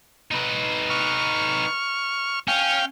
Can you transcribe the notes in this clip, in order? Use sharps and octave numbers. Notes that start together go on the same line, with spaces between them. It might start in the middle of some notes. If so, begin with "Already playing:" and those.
D#4 B4
C#6 F6
C#4 F5 G5